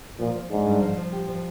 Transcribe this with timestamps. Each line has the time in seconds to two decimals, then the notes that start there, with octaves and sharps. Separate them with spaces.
0.19 A#2 F3
0.35 F3
0.50 G#2 D4
0.66 G2
0.82 F3
0.97 F3
1.12 G4
1.28 F3